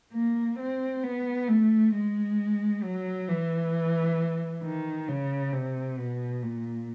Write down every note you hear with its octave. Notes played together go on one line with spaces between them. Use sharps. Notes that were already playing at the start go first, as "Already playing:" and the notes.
A#3
C4
B3
A3
G#3
F#3
E3
D#3
C#3
C3
B2
A#2